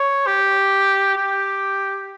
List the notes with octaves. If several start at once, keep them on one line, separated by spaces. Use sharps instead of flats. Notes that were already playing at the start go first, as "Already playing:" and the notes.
Already playing: C#5
G4
G4